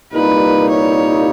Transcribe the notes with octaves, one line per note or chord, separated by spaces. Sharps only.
C2 A#2 G3 A#3 D#4 B4
C#5